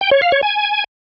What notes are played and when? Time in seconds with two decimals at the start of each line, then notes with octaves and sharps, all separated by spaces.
0.01 G5
0.11 C#5
0.22 F5
0.32 C#5
0.43 G#5